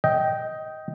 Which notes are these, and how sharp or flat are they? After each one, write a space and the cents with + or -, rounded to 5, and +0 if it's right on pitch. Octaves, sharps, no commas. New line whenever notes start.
D#5 +15 G5 -10